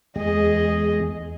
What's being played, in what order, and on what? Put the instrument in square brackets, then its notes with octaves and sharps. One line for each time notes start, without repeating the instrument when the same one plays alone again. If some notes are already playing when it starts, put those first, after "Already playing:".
[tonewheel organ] E2 G#3 [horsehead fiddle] G#4 D#5